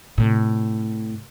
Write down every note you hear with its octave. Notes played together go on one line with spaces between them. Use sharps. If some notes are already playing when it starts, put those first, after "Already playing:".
A2 C3